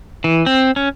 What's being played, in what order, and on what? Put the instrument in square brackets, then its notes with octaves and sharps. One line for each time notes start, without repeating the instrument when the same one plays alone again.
[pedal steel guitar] E3
C4
C#4